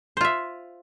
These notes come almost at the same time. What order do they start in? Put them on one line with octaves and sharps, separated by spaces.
C5 F4 E5